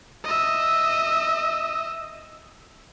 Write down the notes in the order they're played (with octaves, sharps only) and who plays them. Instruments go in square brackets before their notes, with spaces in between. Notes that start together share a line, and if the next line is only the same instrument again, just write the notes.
[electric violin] D#5 E5